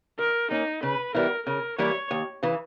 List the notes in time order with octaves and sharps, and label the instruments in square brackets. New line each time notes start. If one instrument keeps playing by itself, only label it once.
[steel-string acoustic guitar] D#3 [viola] A#4
[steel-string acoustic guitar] A#3 C#4 [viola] D#4
[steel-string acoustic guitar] C#3 [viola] B4
[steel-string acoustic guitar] E3 G3 B3 E4 [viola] A#4
[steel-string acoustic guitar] C#3 [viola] A#4
[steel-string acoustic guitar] E3 G3 A#3 E4 [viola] C#5
[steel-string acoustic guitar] D#2
C#3 E3